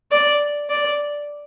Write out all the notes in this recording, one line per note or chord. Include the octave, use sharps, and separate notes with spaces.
D5
D5